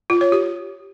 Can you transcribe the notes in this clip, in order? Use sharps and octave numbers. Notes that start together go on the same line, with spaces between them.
F4
C#5
G4